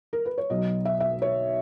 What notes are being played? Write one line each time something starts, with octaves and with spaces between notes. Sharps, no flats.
A#4
B4
C#5
B1 B2 F#3 D#5
E5
E5
C#5